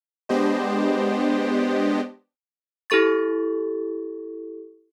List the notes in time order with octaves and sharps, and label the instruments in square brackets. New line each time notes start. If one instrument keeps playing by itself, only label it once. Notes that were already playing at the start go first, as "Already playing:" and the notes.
[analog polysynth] G#3 B3 D4 G4 C5 D#5
[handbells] E4 G4 A4 C#6 A6